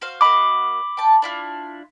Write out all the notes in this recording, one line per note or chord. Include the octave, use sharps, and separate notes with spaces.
F#4 C5 F5
A#3 F#4 D#5 B5 D6
G5 A5
D4 E4 F4